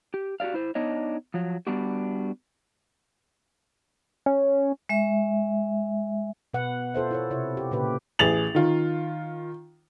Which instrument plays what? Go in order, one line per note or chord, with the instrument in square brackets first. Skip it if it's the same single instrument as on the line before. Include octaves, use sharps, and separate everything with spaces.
[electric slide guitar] G4
F#4 G4 A4 D5 F5
E4 C5
B3 D4 D#4 C#5 D#5
F3 F#3
G3 B3 D4 F#4 G4
[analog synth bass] C#4
[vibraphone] G#3 E5
[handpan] B2 B4 F#5
F4 A4 C5 E5
E4 A4 C#5
C3 E4 C#5
G4
A#2 C#3 A#3 G4 B4
[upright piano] A1 G#4 A6 F7 F#7
D#3 F4